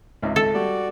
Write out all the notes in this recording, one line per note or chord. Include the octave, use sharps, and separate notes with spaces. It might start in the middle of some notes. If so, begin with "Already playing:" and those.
G#1 C#2 E5
A4
G3 F#4 D5